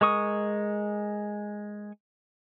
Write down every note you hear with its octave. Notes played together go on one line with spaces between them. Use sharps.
G#3 A#4 C#6 D#6